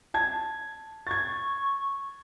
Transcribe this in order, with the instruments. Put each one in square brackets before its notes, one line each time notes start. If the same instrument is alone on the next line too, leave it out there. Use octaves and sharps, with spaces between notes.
[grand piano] A5 G#6
[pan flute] C#6 [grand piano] G#6 A6